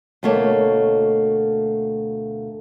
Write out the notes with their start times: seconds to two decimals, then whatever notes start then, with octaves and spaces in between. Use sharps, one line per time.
0.23 D2 B2 A3 A#3 C#5